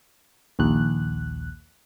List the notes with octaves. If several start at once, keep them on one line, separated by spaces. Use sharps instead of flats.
A#1 D#2 F#6